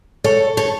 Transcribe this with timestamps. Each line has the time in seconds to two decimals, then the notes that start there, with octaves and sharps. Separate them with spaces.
0.24 A4 C#5
0.57 A4 C#5